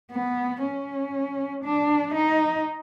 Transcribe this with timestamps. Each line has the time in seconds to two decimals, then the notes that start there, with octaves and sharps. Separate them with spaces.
0.12 B3
0.62 C#4
1.64 D4
2.14 D#4